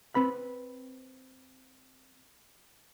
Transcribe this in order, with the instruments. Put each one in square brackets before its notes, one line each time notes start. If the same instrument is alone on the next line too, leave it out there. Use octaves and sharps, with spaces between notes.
[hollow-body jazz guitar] C4 B4 B5